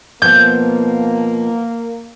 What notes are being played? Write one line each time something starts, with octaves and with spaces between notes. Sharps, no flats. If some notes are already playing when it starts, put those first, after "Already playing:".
B2 F3 A#3 B3 G6